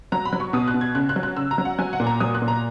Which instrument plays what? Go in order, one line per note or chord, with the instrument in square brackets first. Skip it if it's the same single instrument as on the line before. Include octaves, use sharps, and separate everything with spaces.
[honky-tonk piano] F#3 A#5
B5
F#3
C#6
B2 D#6
F#6
B2
G#6
C#3 F#6
F#6
F#3
F#6
C#3 E6
A#5
F#3
F#5
F#3 G#5
F#5
A#2
A#5
F#3 D#6
F#6
A#2
A#5